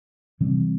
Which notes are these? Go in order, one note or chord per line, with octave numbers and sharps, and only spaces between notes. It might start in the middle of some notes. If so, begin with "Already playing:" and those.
C3 E3 G3 C4